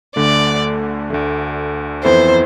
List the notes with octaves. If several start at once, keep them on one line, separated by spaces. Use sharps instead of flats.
D2 D3 A3 D5
D2 D3 A3
F2 E3 B3 E4 A4 C5